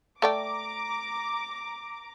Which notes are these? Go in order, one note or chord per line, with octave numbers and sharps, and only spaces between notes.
A3 D5 G5 A#5 D6